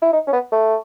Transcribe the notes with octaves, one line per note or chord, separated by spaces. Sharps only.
E4
D#4
C#4
B3
A3